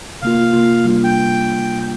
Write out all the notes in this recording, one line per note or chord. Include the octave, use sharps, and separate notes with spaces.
C3 A#3 F4 F5
C3 A#3 F4
C3 G3 A#3 D4 F4
G5